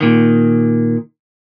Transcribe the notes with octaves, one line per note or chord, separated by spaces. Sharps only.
A#2 D#3